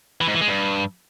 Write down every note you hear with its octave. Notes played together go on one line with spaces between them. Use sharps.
E3
G#2
E3
G#3
G2